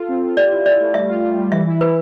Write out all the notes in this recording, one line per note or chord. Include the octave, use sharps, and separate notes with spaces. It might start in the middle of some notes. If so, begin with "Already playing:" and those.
Already playing: F4 A4
C4
F4
G4 D5
E4
E4 D5
A3
G3 E5
F4
G3
G3
E3 E5
E4
E4 B4